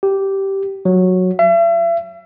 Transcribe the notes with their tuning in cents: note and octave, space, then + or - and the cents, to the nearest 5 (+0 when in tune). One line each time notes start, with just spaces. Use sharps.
G4 -10
F#3 -10
E5 +40